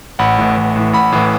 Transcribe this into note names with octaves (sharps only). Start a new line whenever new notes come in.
A1 F#5 B5
A2 E3
A1
A2 E3
A1 F#5 B5
A2 E3